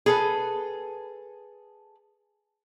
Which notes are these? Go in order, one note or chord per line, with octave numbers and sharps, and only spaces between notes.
G#4 A4 B4